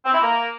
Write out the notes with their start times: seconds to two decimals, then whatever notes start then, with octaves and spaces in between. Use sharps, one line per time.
0.05 C4
0.13 E4
0.21 A#3